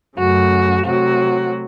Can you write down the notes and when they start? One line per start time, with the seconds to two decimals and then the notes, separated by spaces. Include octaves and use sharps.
0.18 F#2 C#3 A3 F#4
0.86 C3 F#3 A3 F#4